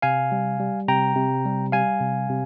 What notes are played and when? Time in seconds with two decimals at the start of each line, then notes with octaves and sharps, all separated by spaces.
0.02 C3 F5 G#5
0.32 G3
0.60 G3
0.88 C3 G5 A#5
1.16 C3
1.45 G3
1.72 G3 F5 G#5
2.01 C3
2.29 C3